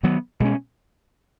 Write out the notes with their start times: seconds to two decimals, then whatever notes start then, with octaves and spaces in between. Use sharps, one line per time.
0.03 D#3 F#3 B3
0.40 B2 G#3 C#4